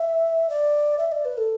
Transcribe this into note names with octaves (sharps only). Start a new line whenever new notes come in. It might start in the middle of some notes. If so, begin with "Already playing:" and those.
Already playing: E5
D5
E5
D5
B4
A4